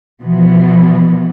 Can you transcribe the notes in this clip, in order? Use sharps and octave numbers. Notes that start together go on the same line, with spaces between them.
B2 E3 F3 B3